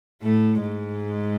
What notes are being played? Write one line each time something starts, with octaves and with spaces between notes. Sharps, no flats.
A2 A3
G#2 G#3